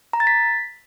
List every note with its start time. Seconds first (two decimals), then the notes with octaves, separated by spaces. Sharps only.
0.13 A#5
0.20 A6
0.27 B6